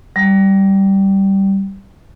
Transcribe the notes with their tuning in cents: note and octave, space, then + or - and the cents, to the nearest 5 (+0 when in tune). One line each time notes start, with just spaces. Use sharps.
G3 -10